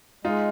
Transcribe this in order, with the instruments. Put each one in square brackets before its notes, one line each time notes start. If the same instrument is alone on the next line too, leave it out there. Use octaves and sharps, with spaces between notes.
[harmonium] G#3 [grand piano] D#4 F4